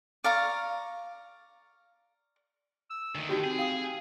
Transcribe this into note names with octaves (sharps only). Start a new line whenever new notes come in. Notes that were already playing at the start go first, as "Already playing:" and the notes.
D5 F5 A#5 C#6
E6
D2 D#3
D#4 F#4 G4 G5
C4 G#4
F5 G5 D#6